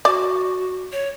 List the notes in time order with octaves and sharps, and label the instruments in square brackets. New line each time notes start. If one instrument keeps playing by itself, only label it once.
[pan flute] F#4 [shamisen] D5
[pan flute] C#5